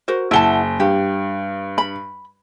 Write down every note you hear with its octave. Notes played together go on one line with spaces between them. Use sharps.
F#4 A#4 C5
F#1 E4 F#5 A5 G7
G2 G4
B5